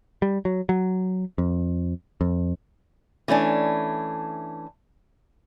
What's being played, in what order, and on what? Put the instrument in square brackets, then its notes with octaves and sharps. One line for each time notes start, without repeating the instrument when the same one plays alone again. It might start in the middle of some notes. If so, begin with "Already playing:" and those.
[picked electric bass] G3
F#3
F#3
F2
F2
[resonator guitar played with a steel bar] E3 A3 C#4 D4